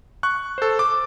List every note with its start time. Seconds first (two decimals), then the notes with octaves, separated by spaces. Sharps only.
0.23 C#6 F#6
0.58 A4 C5
0.79 D6